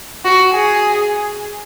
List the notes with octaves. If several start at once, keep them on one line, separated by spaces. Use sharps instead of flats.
F#4
G#4